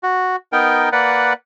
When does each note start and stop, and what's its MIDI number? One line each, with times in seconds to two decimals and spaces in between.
0.03 0.36 66
0.52 0.89 59
0.52 0.89 63
0.52 0.89 70
0.52 0.89 79
0.92 1.33 58
0.92 1.33 71
0.92 1.33 74
0.92 1.33 78